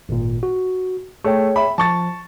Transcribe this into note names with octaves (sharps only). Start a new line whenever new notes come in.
G#1 A#2
F#4
A3 G#4 C#5 G5
E5 B5
F3 A5 C#6 A6